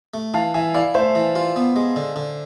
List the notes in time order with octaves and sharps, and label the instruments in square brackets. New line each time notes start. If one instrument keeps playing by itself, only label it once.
[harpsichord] A3
[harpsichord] E3 [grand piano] F5 A5
[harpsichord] E3 [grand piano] E5 G#5
[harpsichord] E4 [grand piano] D5 F5
[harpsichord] A3 [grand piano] C5 E5
[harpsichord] E3
F4
B3
G#3
D3
D3